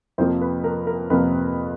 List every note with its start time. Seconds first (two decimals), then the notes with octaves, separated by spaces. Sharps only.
0.18 F2 C3 F3 A#3 C5
0.41 B4
0.64 A#4
0.87 A#4
1.10 F2 C3 F3 A#3 B4